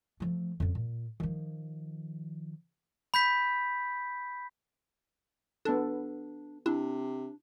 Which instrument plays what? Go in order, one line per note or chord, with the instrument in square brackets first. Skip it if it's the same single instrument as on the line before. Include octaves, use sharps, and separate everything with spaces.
[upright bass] F3 A3
F2 C#3
A#2
D#3 F3
[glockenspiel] B5 G6 B6
[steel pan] B3 A4 [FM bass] D4
[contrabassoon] C3 [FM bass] D4 [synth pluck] E4